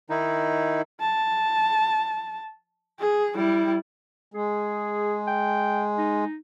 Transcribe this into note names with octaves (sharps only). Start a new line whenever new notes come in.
D#3 D#4 E4
A5
G#4
G3 E4
G#3 G#4
G5
D#4